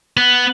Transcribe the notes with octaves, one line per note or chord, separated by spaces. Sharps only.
B3